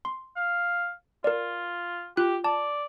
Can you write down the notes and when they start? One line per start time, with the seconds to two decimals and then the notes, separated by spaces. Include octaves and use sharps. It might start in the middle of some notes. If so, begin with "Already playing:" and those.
0.05 C6
0.36 F5
1.24 F4 A#4 D5
2.17 F4 G4 F#6
2.44 D5 A5